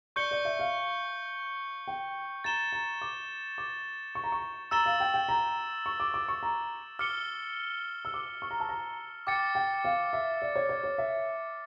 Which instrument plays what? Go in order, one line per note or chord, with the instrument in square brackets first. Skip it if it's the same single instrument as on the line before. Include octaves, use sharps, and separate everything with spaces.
[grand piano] D5 [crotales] C#6 G6 C#7 G7
[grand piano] D5
E5
F5
G5
[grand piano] A#5 [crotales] A6 E7 G7
[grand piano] A#5
D6
D6
C#6
A#5
C#6
[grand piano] A#5 [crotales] E6 A6 E7 G7
[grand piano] F5
G5
G5
A#5
C#6
D6
D6
C#6
A#5
[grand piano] D6 [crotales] F6 C#7 G7
[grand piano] E6
D6
C#6
A#5
A5
A#5
[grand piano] G5 [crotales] D6 A6 C#7
[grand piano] G5
F5
E5
D5
C#5
C#5
C#5
E5